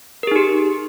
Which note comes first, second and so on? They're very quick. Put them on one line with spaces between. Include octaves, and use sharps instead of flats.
A#4 G#4 D#4 G4